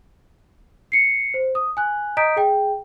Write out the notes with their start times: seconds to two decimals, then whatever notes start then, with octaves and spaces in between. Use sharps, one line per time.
0.92 C7 C#7
1.34 C5
1.55 D#6
1.77 G#5 F#6
2.17 D#5 A#5 D#6 G6 B6 D7
2.36 G#4 G5